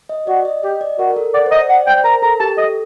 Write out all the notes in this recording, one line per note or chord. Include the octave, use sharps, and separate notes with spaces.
D#5
F#4 D5
D#5
G4 D#5
D5
F#4 A#4
A#4
A4
D5 F#5
C5
D5 D#5
D5 F#5
C5 G5
A#4 A#5
A4 A#5
G4 A5
A4 D#5